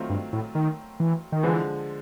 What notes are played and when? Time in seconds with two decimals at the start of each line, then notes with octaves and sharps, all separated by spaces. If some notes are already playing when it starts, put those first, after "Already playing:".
Already playing: D#3 F#3 A3 C4 F4
0.09 G2
0.33 A2
0.55 D#3
1.00 E3
1.32 D#3
1.43 D3 E3 F3 G#3